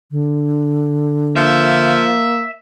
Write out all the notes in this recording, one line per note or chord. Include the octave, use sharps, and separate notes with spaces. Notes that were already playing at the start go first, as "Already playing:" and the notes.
D3
F3 A#3 E5